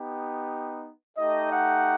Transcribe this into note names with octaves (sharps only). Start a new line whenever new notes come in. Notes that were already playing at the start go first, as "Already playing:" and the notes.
Already playing: B3 D#4 G4
A3 D#4 G4 D#5
F#5